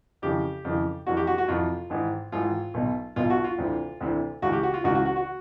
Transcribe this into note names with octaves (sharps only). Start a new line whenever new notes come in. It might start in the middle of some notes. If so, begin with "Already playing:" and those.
F2 C#3 E3 G4
F2 C#3 E3
F2 C3 E3 F#4
G4
F#4
F#4
F2 C3 E3 F4
G#1 G#2 E3
G#1 G#2 E3 F4
B1 B2
B1 B2 F4
F#4
F4
D2 C3 E3
D2 C3 E3
C#2 C#3 E3 F#4
G4
F#4
F4
C#2 C#3 E3 F#4
F#4
F#4
F#4